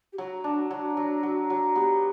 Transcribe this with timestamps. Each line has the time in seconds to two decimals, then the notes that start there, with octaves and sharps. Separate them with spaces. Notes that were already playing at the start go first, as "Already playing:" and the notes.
0.13 G4
0.18 F#3 F#4
0.44 D4
0.71 F#3
0.97 F#3
1.23 F#3
1.50 F#3
1.76 B3 G4